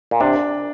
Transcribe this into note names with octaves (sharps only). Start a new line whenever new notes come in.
A#2
C3 D4